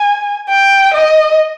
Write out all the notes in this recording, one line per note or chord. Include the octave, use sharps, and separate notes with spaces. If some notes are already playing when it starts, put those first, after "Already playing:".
Already playing: G#5
G5
D#5